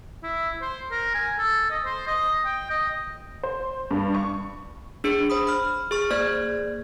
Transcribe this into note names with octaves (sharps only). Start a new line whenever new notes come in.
E4
C5
A#4
G#5
A4
D#5
C5
D#5
G5
D#5
C5
G2
C#6
D4 G#4 C#7
C5 B5 D#6
B5 F6
G#4 C#6 F6
A#3 G#4 C5 D5 G#6